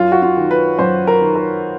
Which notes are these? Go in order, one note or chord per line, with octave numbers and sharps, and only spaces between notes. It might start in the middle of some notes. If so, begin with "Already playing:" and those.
Already playing: F#2 F4
F#4
F4
D#3
B4
F#2 C5
A#4
D#3
A#4